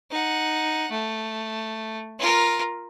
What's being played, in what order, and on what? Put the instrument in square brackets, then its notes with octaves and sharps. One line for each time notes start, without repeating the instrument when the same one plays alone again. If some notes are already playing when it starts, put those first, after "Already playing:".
[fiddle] D#4 F#5
A3
F4 A#4